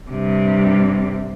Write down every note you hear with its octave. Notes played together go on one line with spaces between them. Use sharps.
G2 C3